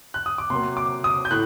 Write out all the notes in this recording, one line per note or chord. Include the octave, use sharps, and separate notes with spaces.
F#6
D#6
D6
C3 F#3 A#3 C6
D6
D#6
G6
A2 F#6